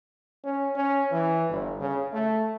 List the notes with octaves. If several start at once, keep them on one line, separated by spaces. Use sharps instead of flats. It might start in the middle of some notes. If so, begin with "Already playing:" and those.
C#4
C#4
E3
G1
C#3
A3